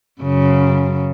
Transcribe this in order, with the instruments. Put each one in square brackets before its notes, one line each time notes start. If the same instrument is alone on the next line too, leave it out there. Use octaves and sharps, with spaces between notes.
[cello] F#2 C#3